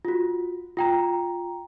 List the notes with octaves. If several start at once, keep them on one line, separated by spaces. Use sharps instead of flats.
F4 F#4
F4 G5 A#5